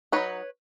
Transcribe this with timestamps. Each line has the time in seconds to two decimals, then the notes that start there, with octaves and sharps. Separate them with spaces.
0.12 F#3 B3 D#4 B4 C#5